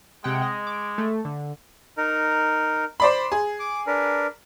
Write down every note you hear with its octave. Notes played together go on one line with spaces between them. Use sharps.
C3 G#3 F#5 G5
D#5
D6
A3
D3
D#4 A#4
C5 D5 B5 C6
G#4
D6
D4 A#4 B4